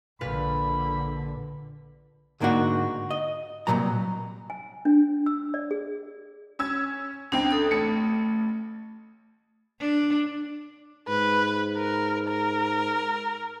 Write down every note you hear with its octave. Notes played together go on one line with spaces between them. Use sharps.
A#1 A#2 D3 B4 B5 F6
D2 G#2 A#3 D4 D#4 F#4
D#5
C2 G2 A#2 F#3 A#5
G#5
D4
E6
D5
G#4
C#4 E6 G#6
C#2 C4 D4 G5
A4 D#6
A1 A3 C#7
D4
G#2 B4
A#4
A#4